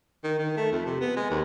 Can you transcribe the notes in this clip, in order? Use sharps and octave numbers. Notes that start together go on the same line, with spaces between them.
D#3
D#3
A3
F2
C3
B3
G#3
D#2